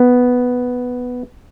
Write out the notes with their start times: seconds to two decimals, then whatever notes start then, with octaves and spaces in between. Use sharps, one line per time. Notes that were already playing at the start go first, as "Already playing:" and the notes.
Already playing: B3